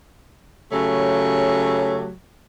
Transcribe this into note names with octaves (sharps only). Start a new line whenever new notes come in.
C#3 F#3 A3 G4 C#5